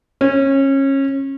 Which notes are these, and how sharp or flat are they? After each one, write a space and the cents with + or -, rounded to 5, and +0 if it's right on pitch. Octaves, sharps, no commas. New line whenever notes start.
C#4 -25